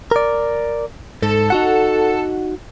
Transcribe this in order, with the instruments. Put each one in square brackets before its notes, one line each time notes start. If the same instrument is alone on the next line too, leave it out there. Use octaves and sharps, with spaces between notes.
[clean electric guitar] A#4 D5
[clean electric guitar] G#2 [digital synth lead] A4
[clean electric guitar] D#4 F#4 F#5